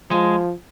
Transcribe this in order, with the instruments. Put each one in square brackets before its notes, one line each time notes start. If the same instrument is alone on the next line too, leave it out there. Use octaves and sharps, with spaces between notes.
[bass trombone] F3 [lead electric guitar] G#3